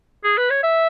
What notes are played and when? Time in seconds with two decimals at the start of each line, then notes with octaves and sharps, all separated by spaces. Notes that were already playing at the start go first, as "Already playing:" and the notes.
0.24 G#4
0.38 B4
0.50 C#5
0.63 E5